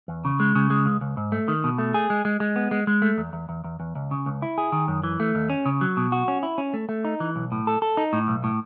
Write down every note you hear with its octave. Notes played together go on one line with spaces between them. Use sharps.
E2
C#3
G#3
C#3
G#3
C#2
C#2
G#2
A3
D#3
B2
A3
G#4
G#3
G#3
G#3
B3
G#3
G#3
A3
E2
E2
E2
E2
E2
C#2
C#3
C#2
E4
G#4
D#3
F#2
E3
A3
D#2
C#4
C#3
F#3
B2
F#4
C#4
E4
C#4
A3
A3
D#4
E3
B1
A2
A4
A4
D#4
A2
B1
A2